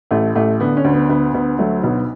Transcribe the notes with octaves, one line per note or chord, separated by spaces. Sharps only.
A1 A3
A1 A3
D3 B3
C#4
D2
B3
D2 B3
D2 B3
F#3 A3
B1 B3